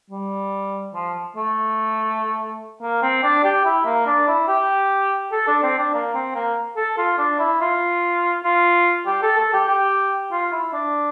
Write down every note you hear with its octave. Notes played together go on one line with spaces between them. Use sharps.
G3
F3
A3
A#3
C4
D4
G4
E4
A#3
D4
E4
G4
A4
D4
C4
D4
A#3
C4
A#3
A4
F4
D4
E4
F4
F4
G4
A4
A4
G4
G4
F4
E4
D4